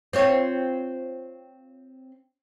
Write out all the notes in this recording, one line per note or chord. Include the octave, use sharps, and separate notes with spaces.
C4 F4 C#5